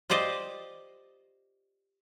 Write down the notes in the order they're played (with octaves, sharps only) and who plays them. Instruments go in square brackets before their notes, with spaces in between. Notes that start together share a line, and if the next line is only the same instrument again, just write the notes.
[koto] F4 G4 C5 D5 D#5